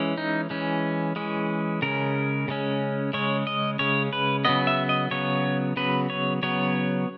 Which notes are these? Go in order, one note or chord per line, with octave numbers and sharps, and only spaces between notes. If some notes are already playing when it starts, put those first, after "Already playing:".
Already playing: E3 G#3 C#4
D#4
E3 G#3 C#4
E3 G#3 C#4
C#3 G#3 C#4 A#4
C#3 G#3 C#4
C#3 G#3 C#4 C#5
D#5
C#3 G#3 C#4 C#5
B4
C#3 F#3 B3 D#5
E5
D#5
C#3 F#3 B3 C#5
C#3 F#3 B3 B4
C#5
C#3 F#3 B3 C#5